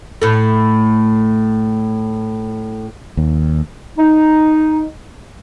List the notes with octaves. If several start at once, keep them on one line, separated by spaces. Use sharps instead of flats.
A2 A3
D#2
D#4